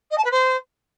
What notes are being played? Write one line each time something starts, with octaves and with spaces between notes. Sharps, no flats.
D#5
A5
B4
C5